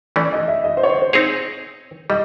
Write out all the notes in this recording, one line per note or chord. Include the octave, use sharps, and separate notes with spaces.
E3 A3 C#4 D5
D#5
E5
D#5
C5
C#5
C5
C5
C4 D#4 G#4 C#5
G3 D#5